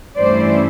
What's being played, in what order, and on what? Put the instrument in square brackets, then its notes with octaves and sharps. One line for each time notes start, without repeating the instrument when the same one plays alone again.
[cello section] G2 E3 A3 C#4 E4 C5 D5